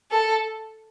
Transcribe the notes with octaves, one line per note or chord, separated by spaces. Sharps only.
A4